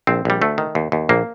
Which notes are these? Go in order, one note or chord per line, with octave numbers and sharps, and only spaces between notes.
A#1 C4
A#1 G3
D2 A3
D#3
D#2
D#2
A#1 A#3